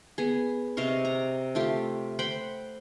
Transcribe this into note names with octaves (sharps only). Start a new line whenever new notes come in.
B3 G#4
C3 D#5 F5 C#6
A#5
A3 F4 G4
C5 F#5 G5 B5